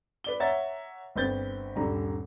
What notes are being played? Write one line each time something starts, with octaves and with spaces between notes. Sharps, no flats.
B4 D5 G7
C#5 E5 F#5 A#5 A6
G1 C4 B4 G6 A6
D#1 G2 D3 A#5